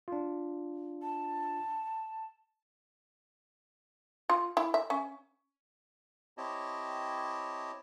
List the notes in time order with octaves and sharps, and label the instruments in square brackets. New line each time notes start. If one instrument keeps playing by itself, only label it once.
[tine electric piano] D4 F4
[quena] A5
[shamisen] F4
E4
E5
C#4
[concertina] C4 E4 G4 C#5 D#5 A5